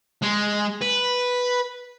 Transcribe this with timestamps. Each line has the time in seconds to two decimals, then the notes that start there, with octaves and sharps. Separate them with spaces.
0.23 G#3
0.82 B4